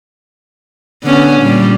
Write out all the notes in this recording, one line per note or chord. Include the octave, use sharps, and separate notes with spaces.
D3 B3 C#4
A#2 G3